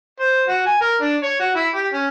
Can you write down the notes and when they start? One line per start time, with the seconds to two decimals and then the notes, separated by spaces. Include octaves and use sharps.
0.20 C5
0.48 F#4
0.66 G#5
0.81 A#4
1.01 D4
1.23 C#5
1.40 F#4
1.55 E4
1.74 G4
1.93 C#4